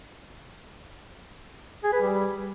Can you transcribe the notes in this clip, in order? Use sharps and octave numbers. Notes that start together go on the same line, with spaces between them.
G#4
B4
G3